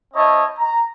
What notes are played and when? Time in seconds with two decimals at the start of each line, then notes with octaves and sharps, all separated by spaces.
0.14 C4 E4 C#5 D#5 A5
0.58 A#5